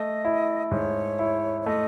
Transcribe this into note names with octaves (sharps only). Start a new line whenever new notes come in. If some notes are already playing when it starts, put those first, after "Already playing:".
Already playing: A3 D#5
E4
G#2 C#5
E4
C#5
A3 D#5